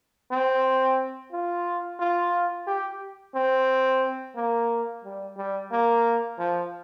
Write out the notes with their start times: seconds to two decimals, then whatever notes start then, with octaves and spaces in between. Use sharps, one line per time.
0.32 C4
1.33 F4
2.00 F4
2.67 G4
3.35 C4
4.36 A#3
5.04 G3
5.37 G3
5.72 A#3
6.39 F3